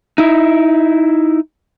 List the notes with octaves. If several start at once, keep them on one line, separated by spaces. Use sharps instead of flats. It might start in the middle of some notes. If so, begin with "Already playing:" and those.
D#4 E4